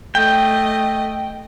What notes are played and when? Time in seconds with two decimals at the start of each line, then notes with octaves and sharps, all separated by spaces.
0.15 A3 D#5 G5